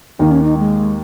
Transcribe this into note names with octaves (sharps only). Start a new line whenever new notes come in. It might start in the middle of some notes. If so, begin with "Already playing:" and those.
D#2 D#3 A#3 D#4
C#4
D#4
G#3